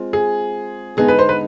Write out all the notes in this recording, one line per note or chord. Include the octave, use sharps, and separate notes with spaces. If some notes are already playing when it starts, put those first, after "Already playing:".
Already playing: G#3 C4 F4
G#4
D3 G#3 B3 D#4 G#4
B4
C5
B4